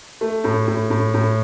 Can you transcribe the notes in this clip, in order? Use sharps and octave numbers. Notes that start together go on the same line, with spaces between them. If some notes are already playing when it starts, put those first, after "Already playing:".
A3
A2
A2
A2
A2